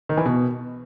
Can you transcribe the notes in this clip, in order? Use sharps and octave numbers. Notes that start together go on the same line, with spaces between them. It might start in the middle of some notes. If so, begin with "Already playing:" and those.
D#3
E3
B2